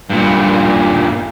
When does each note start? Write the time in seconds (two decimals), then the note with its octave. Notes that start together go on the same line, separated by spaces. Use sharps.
0.10 G2 A#2